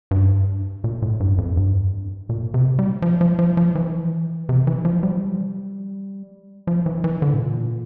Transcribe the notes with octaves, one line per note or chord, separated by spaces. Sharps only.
G2
A#2
A2
G2
F2
G2
A#2
C3
G3
F3
F3
F3
F3
E3
C3
E3
F3
G3
F3
G3
F3
E3
E3
D3
A2
A#2